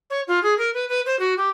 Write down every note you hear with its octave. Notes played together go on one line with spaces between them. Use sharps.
C#5
F4
G#4
A#4
B4
B4
C5
F#4
G4